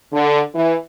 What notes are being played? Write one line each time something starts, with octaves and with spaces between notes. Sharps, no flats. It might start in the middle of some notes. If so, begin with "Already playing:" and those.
D3
E3